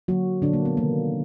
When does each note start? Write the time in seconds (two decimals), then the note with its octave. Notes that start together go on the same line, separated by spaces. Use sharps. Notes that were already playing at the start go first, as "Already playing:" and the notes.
0.08 D3 F#3 A#3 F#4
0.42 A#2 D3 F3 A#3 D4
0.53 A#3
0.65 B3
0.77 C3 D#3 G3 A#3